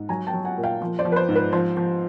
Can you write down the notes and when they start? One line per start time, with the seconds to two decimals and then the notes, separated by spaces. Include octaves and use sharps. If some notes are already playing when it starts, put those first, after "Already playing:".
Already playing: G#2
0.09 F#3 G#5 A#5
0.27 G5 A5
0.34 F#3
0.45 F#5 G#5
0.57 A#2
0.63 F5 G5
0.82 F3
0.99 C5 D5
1.05 F3
1.12 B4
1.16 C5
1.28 G#2
1.36 B4
1.53 F3 C5
1.77 F3